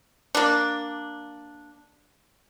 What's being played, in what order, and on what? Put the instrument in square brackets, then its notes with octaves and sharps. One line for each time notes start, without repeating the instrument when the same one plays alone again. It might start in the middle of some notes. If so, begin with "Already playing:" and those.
[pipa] A#3 D4